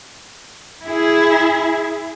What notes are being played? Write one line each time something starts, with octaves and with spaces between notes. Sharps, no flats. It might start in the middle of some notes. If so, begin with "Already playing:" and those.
E4 G#4